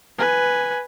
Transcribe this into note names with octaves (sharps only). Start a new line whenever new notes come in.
B4 G#5